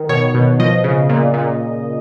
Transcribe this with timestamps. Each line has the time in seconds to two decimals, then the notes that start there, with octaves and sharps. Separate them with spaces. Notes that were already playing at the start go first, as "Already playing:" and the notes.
Already playing: D#3
0.09 B2 C#5
0.34 B2
0.59 F3 D#5
0.84 C#3
1.09 A#2
1.34 A#2